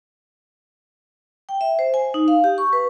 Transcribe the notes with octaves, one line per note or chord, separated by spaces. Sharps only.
G5
E5
C5
G#5
D#4
F5
G4
C#6
B4